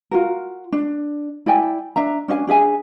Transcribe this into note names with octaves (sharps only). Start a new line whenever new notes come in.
F4 F#4 A#4
D4
E4 D5 G5 G#5
D4 E5 A#5
C#4 D4 D#5 G#5
D4 G#4 E5 G#5